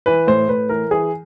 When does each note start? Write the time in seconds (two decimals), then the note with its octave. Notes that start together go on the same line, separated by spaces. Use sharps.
0.06 E3 B4
0.27 A2 C5
0.49 A2 B4
0.69 E3 A#4
0.91 E3 G#4